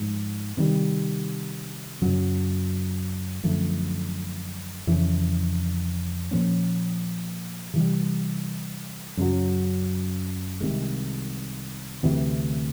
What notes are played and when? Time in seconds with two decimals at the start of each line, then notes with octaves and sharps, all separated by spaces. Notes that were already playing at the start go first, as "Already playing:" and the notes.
Already playing: G#2 F3 G#3
0.57 C3 D#3 G3
2.02 F#2 C#3 F#3
3.43 F#2 D3 F3 A3
4.87 F2 C#3 E3
6.31 A#2 F3 A#3 C#4
7.74 C3 E3 G3
9.17 F#2 C#3 F#3
10.60 C2 C3 D#3 G#3
12.03 D2 C3 E3